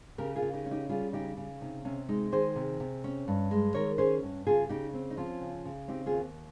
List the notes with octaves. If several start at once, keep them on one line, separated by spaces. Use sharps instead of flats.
C#3 G4 A#4
F4 G#4
C#3
D#4 G4
C#4
D#4 G4
G3 F4 G#4
C#3 D#4 G4
C#3
C3 D#4
C3 C#4
G#3 D#4
D#3 G#4 C5
C3
C3
C#4
G2
G#3
D#3 A#4 C#5
C#4 G#4 C5
G2
C#3 F4 G#4
C#3 D#4 G4
C4
D#4
F3 C#4 F4
C#3
C#3
C4 D#4 G4
F4 G#4
D#2